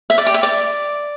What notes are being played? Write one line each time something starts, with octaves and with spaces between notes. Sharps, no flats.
E5
D5
G4
E5
D5